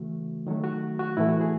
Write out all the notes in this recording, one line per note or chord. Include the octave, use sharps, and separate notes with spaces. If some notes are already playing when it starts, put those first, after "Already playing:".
Already playing: C#3 E3 A3 F#4
D#3 F#3 A3
F#4
F#4
A2 E3 A3 E4
F#4
G#4